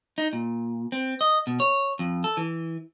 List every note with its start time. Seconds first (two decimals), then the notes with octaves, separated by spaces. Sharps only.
0.18 D#4
0.33 A#2
0.92 C4
1.21 D#5
1.47 B2
1.60 C#5
1.99 F2
2.24 A4
2.37 E3